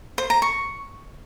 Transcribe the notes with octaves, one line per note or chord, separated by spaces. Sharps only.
C5
A#5
C#6